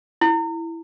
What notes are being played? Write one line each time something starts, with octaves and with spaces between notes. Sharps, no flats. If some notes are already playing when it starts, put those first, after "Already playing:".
E4